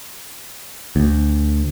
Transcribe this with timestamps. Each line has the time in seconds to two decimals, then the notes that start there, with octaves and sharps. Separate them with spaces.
0.96 D2